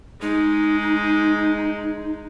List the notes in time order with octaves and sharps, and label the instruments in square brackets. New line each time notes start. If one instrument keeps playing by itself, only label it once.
[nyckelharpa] G#3 [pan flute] D#4